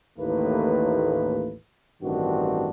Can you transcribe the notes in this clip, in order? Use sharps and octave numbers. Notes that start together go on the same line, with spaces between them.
A1 D#2 A2 A#3 B4
A1 G2 D#3 C4 D4 F#4